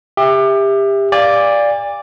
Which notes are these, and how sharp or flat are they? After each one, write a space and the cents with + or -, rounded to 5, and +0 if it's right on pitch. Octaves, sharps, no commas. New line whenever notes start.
G4 +25 E5 +0
D5 +0 F5 +0 G#5 -40